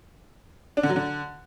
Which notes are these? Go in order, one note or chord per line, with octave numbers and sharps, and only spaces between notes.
D4
D3
F#3
D3